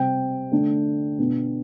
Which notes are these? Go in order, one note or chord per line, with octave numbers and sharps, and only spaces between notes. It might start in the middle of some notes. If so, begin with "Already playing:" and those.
Already playing: C3 G3 C4 G5
D3 A3 D4
B2 B3 D4